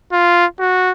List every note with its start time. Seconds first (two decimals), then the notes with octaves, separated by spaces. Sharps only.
0.12 F4
0.59 F#4